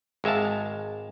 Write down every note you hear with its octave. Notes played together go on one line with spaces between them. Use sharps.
G#1 G#3 E5 F5 A5